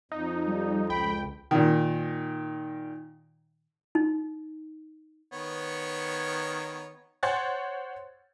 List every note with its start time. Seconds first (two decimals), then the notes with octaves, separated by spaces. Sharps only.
0.12 F2 D#4
0.47 G3
0.90 C#2 G5 B5
1.51 A#2 D#3
3.95 D#4
5.32 D#3 B3 C#5
7.23 C5 C#5 F#5 G#6 A6